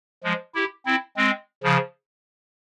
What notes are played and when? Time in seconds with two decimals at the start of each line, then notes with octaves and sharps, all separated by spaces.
0.24 F3 G#3
0.55 E4 G4
0.86 C4 E4
1.17 G#3 C4
1.64 C#3 F3